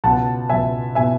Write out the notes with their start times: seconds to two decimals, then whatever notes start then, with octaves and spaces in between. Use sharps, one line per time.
0.04 C#2 B2 F#5 A5
0.49 C#2 B2 E5 G#5
0.95 B2 E5 G#5